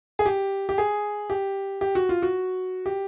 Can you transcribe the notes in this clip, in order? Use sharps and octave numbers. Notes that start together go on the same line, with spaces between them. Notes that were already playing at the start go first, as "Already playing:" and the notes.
G#4
G4
G4
G#4
G4
G4
F#4
F4
F#4
G4